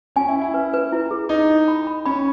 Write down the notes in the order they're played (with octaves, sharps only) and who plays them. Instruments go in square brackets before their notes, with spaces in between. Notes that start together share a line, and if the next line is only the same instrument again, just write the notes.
[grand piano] C#4 [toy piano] G#5
[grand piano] E4
[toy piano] G#5
[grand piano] E4
[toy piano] B4
B4
E4
G#4
[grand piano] D#4 [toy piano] D#5
[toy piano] E4
B5
B5
[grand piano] C#4 [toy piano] B5